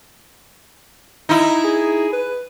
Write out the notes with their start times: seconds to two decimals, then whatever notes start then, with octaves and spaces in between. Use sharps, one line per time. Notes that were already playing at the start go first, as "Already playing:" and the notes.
1.29 D#4 E4
1.64 G#4
2.12 B4